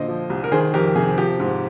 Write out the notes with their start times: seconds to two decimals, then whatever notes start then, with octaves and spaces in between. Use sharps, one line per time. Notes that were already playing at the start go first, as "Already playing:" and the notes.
Already playing: A#2 D3 C5 D#5
0.08 F3
0.30 C2
0.44 A#4
0.52 D#3 G#4 C5
0.74 F2 G4 A#4
0.95 C3 G#4
1.17 F3 G4
1.40 G#2